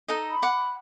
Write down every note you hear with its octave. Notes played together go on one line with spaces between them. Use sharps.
D#4 A4 D#5
B5
F#5 D6